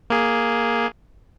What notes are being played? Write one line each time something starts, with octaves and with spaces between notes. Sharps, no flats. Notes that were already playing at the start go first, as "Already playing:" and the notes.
A#3 G#4